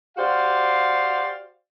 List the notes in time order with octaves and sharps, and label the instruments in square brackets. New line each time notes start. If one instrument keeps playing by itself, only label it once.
[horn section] F#4 G4 C5 D5 F5